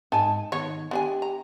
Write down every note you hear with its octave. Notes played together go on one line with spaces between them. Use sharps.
G#2 D#4 G#5 A5
D#3 B3 C#5
B3 D4 G4 G#5
A#5